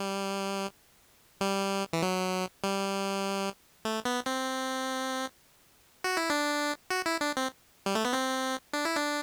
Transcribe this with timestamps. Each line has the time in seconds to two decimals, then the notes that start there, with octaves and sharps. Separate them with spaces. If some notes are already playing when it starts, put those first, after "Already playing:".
Already playing: G3
1.41 G3
1.93 E3
2.02 F#3
2.64 G3
3.85 A3
4.05 B3
4.26 C4
6.04 F#4
6.17 E4
6.30 D4
6.90 F#4
7.06 E4
7.21 D4
7.37 C4
7.86 G3
7.95 A3
8.05 B3
8.13 C4
8.73 D4
8.85 E4
8.96 D4